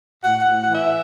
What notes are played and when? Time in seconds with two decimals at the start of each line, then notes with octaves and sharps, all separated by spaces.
0.24 A2 F#5
0.41 F#5
0.47 A2
0.63 F#5
0.70 E3
0.75 E5